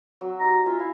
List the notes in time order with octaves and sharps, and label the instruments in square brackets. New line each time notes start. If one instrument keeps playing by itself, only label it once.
[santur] F#3 E6
[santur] D#4 G4 [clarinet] A#5
[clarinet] F4 [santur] E5 G#5
[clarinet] E4 [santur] F5